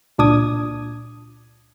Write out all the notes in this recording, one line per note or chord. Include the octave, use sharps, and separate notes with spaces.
C#2 A#2 D4 D6 D#6 G#6